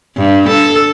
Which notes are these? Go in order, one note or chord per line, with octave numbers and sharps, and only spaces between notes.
G2
A4